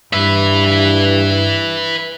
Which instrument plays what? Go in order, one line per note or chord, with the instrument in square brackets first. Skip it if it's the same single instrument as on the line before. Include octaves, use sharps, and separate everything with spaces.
[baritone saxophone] G2 [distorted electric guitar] B4 E5